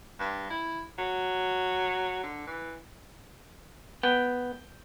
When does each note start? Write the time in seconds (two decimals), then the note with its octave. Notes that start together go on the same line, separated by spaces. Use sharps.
0.20 G2
0.50 E4
0.98 F#3
2.23 D3
2.47 E3
4.03 B3 G5